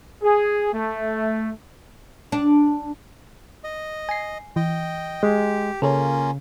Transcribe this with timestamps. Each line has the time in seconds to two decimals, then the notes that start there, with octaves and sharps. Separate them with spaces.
0.22 G#4
0.73 A3
2.32 D4
3.64 D#5
4.09 G#5 C7
4.56 E3 D#5 G5
5.23 G#3 G4
5.82 C#3 A#3 C#4 F4 A4 A#4 C#5